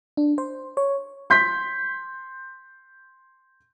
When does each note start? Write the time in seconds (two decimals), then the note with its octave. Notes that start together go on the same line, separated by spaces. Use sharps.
0.17 D4
0.38 C5
0.77 C#5
1.30 C6 G6 B6